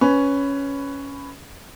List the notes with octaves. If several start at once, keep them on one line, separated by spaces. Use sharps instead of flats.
C#4 B4